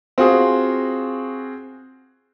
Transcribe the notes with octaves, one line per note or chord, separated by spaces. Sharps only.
C4 F4 F#4 G#4